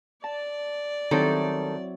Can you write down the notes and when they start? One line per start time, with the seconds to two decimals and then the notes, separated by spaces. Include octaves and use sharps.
0.24 D5 A5
1.11 D#3 F#3 G3 C4 E4 A4